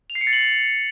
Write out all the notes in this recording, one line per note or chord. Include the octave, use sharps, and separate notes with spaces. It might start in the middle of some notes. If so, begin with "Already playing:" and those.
F7
C7
C#7
A6
F#7